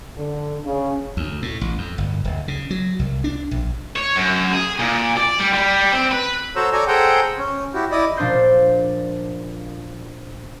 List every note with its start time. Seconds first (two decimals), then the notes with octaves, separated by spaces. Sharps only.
0.17 D3
0.65 C#3
1.17 D2
1.42 A2
1.61 A1
1.78 F2
1.98 G1
2.25 D1
2.48 C#3
2.71 F#3
2.99 C2
3.24 D4
3.51 A#1
3.96 C#5
4.16 F#2
4.53 G#4
4.79 A#2
5.17 D5
5.40 G3
5.53 G3
5.93 C4
6.11 B4
6.56 F#4 A4 C5 C#5 A#5 E6
6.72 A4 C#5 D5 G#5 A#5
6.87 G#4 A4 C5 F#5 G5 A#5
7.38 C#4
7.74 E4 F#4 G4
7.91 E4 D5 D#5
8.17 A#2 F3 D4 C5 C6 G6